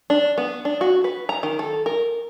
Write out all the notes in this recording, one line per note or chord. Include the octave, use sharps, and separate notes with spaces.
D4
B3
D4
F#4
B4
A#5
D#3
A4
A#4